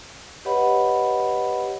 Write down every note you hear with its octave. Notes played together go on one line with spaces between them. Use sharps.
G4 B4 C#5 D#5 F#5 B5